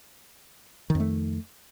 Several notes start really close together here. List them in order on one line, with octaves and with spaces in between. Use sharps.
D#3 F2 A3